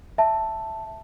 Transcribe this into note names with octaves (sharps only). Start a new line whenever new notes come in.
E5 A5